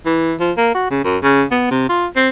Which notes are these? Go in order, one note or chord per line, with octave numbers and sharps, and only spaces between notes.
E3
F3
A#3
F#4
C#3
F#2
C#3
B3
C3
F4
C4